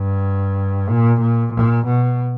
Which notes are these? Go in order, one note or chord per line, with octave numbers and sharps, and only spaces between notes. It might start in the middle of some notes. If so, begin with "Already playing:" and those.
Already playing: G2
A#2
A#2
A#2
B2